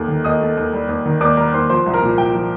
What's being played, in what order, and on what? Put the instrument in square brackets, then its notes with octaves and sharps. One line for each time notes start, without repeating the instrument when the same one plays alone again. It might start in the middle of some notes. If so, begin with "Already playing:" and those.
Already playing: [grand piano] D#2 A3
D#3
D#2 D#5 D#6
A3
D#2
G3
D#2
D#3
D#2 D5 D6
G3 A#4 A#5
D#2 C5 C6
F3 C5 C6
C2
A#4 A#5
A#2
C2 G5
F3